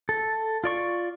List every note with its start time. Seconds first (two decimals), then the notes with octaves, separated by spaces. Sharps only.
0.09 A4
0.64 F4 D5 C#6